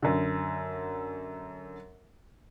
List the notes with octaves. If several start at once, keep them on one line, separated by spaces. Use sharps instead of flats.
F#2 D3